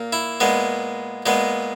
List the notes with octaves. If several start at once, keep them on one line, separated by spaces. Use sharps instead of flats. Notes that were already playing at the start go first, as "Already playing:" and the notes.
Already playing: A#2 A#3
E4
A#2 G#3 B3
A#2 G#3 B3